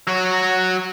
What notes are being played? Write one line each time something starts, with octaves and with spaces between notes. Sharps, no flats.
F#3 F#4